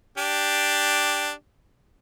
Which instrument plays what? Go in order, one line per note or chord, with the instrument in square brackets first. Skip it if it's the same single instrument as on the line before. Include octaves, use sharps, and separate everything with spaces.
[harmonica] D4 G4